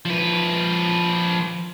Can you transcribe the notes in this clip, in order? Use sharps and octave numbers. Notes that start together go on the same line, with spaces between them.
F3 B4